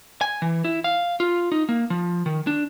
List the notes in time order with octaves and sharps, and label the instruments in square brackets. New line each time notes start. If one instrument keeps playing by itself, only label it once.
[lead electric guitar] G#5
E3
E4
F5
F4
D#4
A#3
F3
D#3
D4